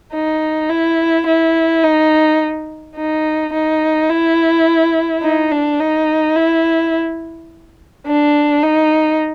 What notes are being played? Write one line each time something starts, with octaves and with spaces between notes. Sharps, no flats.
D#4
E4
E4
D#4
D#4
D#4
E4
D#4
D4
D#4
E4
D4
D#4